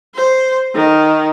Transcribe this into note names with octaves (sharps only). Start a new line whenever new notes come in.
C5
D#3